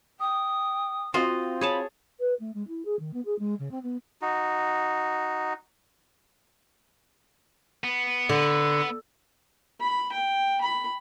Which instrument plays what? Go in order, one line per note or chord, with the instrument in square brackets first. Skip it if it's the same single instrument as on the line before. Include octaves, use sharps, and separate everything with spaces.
[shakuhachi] G5 [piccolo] D#6
[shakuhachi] C4 [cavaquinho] F4 D#5 [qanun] F#4
[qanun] G#4 C#5 A5 [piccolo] B5
[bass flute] B4
A3
G#3
E4
G#4
D#3
B3
G#4
G#3
C#3
C4
B3
[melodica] D#4 F#4
[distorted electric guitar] B3
[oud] D3
[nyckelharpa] B5
G5
B5